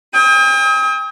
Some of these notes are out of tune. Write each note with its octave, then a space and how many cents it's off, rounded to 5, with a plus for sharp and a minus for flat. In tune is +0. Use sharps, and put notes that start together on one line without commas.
G5 +40 D#6 +40